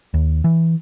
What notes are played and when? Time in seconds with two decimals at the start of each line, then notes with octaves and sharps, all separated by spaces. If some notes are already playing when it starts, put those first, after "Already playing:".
0.14 D#2
0.44 E3